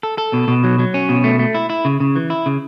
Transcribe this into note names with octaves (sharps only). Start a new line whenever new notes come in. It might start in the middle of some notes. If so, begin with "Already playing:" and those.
A4
A4
B2
B2
F#3
F#3
C#4
B2
A3
A3
E4
E4
C#3
C#3
E3
E4
C#3